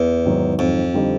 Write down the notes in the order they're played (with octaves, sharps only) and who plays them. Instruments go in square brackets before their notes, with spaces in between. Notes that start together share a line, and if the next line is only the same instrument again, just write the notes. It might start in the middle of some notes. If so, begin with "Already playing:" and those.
Already playing: [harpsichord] E2
[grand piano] G#2 D#3 F#3
[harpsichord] F2
[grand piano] D3 G3 C4 D#4